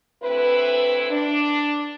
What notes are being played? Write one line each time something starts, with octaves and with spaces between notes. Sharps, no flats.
D2 C4 E4 B4
D4